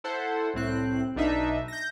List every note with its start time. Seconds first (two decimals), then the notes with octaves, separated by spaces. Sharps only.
0.04 E4 A4 C5 F#5
0.54 C2 A2 C4 F#6
1.15 B1 B2 D4 D#4 E5
1.68 G6 A#6